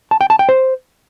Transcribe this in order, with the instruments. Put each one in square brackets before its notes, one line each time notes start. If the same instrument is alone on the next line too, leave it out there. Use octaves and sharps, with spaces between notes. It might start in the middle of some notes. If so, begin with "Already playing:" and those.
[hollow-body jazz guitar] A5
G5
A5
G5
C5